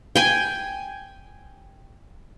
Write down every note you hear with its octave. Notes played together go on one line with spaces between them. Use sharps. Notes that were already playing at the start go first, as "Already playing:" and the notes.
G5 G#5